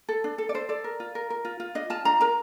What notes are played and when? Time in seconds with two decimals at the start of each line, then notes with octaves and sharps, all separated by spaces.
0.09 A4
0.24 D4
0.38 A4
0.49 D5
0.54 A4 C5
0.69 A4 D5
0.84 A#4
1.00 F4
1.15 A#4
1.30 A#4
1.45 F4
1.60 F4
1.75 D4 D#5
1.90 F4 A5
2.05 D4 A#5
2.21 A#4 A#5